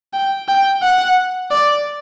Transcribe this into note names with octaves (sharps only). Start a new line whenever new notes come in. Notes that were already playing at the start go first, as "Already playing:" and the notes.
G5
G5
F#5
D5